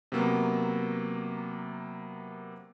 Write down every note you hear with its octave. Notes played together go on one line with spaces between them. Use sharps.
C3 F#3 A#3 B3